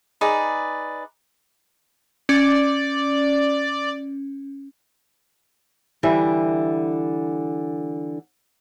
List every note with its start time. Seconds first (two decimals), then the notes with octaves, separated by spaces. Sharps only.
0.21 D#4 G#4 B4 D5
2.29 C#4 D5
6.03 D3 E3 G3 E5